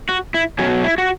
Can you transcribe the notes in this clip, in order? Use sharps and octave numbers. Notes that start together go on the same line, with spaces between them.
F#4
E4
B2 F#3 C#4
E4
F#4